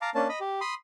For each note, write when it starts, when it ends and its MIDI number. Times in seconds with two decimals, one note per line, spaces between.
0.02 0.10 77
0.02 0.10 81
0.02 0.10 82
0.02 0.10 86
0.15 0.28 58
0.15 0.28 61
0.15 0.28 62
0.15 0.28 81
0.29 0.39 75
0.29 0.39 83
0.40 0.60 67
0.61 0.74 83
0.61 0.74 84
0.61 0.74 87